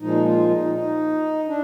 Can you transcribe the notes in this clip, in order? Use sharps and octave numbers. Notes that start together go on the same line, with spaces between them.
A#2 F3 G#3 D#4
F4
D#4
D#4
D4